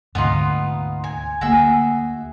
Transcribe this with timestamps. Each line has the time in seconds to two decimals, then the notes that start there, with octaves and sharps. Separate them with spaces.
0.15 D2 G#2 C3 B3 D#4 F4
1.04 G#5
1.41 D2 A#3 F#4 G#4 E5